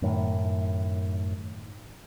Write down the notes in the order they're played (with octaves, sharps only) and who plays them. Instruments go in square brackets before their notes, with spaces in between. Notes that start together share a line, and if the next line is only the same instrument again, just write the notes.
[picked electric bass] F#2 A2 D#3